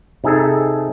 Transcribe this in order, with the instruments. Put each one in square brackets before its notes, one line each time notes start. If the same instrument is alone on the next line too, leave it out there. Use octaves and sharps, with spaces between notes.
[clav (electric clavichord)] C3 D#4 G#4 A4